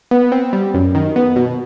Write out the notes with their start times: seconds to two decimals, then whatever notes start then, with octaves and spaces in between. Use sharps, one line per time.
0.11 B3
0.32 C4
0.53 G3
0.74 F#2
0.95 D#3
1.16 B3
1.36 B2